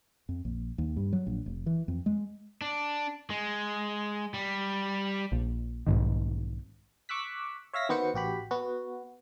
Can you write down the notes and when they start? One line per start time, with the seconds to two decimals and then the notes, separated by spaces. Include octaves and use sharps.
0.29 F2
0.45 A#1
0.78 D#2
0.97 G2
1.13 F#3
1.27 A#1
1.46 F1
1.66 E3
1.88 F2
2.06 G#3
2.61 D4
3.30 G#3
4.34 G3
5.32 A#1
5.87 B1 G#2 D#3
7.09 C#6 D6 E6 F#6 B6
7.73 C#5 E5 F5 A#6 B6
7.89 D#3 B3 F#4 C5 C#7
8.14 A1 F#4 G4 B5
8.51 B3 F#4